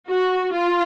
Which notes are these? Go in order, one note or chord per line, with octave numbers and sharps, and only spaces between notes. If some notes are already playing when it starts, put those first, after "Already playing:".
F#4
F4